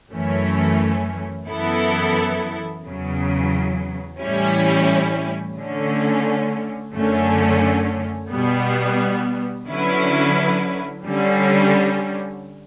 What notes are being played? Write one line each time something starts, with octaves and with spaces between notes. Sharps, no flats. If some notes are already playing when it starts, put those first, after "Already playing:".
F#2 E3 A3 C#4
F#2 E3 B3 E4 A4
E2 C#3 F#3
A2 E3 G3 C#4 E4
D3 A3 C#4
F#2 D3 A3 C#4
B2 G3 B3
D3 F#3 C#4 E4 B4
D3 G3 C#4